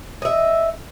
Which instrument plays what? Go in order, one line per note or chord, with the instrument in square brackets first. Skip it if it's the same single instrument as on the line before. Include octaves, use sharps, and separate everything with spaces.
[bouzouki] D#5 E5